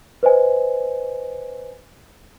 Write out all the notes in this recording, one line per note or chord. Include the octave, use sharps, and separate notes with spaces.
B4 C5 D#5 G#5